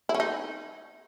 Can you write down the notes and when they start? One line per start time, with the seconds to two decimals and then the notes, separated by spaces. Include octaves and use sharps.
0.09 E4
0.14 C#4
0.20 D#4